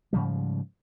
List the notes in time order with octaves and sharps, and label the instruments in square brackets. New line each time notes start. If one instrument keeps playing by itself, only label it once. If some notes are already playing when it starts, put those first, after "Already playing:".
[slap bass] G#2 C#3 F3 G3